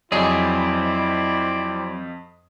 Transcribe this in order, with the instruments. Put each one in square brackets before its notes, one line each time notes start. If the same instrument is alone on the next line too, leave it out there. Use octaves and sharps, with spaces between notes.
[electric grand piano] F2 D#5 D#6 [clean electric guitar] F#3 G#4 [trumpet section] C4 E4 D5